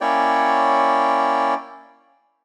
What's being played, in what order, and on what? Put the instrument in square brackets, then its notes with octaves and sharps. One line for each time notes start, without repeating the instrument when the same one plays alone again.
[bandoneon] A#3 C#4 E4 C#5 D5 G5